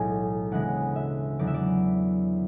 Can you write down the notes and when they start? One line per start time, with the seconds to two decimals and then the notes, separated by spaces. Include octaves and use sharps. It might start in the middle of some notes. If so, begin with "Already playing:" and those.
Already playing: B1 A2 E3 G#3 G#5
0.51 D2 C#3 E3 G#3 F#5
0.96 E5
1.39 E2 D3 F#3 D5
1.47 E5
1.54 D5